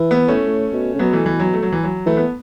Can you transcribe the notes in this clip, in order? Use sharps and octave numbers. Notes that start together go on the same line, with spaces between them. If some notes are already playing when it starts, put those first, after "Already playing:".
Already playing: E3
B3 E4
A3 C#4
A2
B2
C#3
B2 F#3 B3
E3 A3
E3
F#3
A3
F#3
E3
F#3
E3 A3
B3